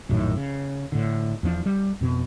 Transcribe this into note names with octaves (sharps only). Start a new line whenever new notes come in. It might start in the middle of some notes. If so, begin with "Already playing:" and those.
A#1 F#2 A2 D#3
C#3
A2 D3
E2 F3 D4
G3
F2 B2